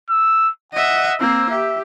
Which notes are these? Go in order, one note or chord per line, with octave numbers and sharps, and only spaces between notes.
E6
D#5 E5 F#5
A#3 C4 E6
G4 E5